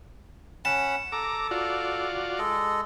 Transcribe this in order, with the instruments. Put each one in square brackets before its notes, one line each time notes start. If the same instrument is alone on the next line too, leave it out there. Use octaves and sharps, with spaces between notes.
[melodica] C#4 F#5 B5 [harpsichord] A5
[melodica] A4 [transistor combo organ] A#5 D6
[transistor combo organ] F4 F#4 D5
[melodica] G#3 A4 D#5